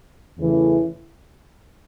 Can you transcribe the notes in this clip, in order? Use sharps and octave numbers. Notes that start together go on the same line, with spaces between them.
E2 C#3 E3 A3